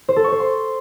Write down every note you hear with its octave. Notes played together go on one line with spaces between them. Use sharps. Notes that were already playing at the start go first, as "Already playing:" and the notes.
C5
A4
C#6
C5
C6